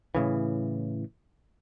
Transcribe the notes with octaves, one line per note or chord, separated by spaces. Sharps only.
A2 C#3 E3